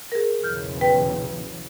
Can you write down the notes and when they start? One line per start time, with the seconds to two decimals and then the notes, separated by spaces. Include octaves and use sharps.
0.12 G#4 A#4
0.43 B1 E2 C#3 F6 G6
0.81 B4 G5